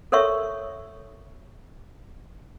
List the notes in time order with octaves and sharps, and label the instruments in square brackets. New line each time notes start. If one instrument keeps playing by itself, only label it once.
[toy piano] A4 A#4 C#5 E5 C#6